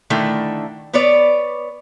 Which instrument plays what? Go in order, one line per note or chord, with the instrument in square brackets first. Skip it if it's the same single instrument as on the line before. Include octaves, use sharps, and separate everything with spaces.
[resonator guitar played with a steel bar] D3 D#3 A3 E4
B3 B4 C#5 D5